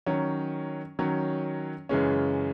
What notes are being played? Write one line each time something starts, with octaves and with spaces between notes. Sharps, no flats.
D#3 F#3 C#4
D#3 F#3 C#4
F#2 C#3 E3 G#3 C#4